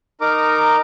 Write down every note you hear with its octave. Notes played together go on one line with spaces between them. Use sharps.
D#4 A#4 A#5 D6